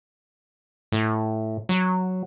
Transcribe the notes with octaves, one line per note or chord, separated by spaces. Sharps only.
A2
F#3